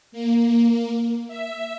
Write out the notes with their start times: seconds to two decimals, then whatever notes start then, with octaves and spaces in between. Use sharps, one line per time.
0.12 A#3
1.28 E5